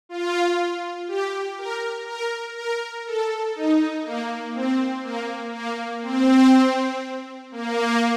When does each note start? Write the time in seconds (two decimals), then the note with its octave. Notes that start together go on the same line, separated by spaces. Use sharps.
0.09 F4
1.08 G4
1.58 A#4
2.08 A#4
2.56 A#4
3.06 A4
3.56 D#4
4.04 A#3
4.55 C4
5.04 A#3
5.53 A#3
6.02 C4
7.52 A#3